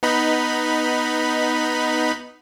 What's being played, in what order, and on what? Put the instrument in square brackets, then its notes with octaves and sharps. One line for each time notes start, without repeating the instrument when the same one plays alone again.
[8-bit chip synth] B3 D#4 B5